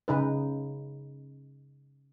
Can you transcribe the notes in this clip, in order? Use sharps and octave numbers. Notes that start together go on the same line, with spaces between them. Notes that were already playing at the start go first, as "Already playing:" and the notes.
C#3 D#4 B4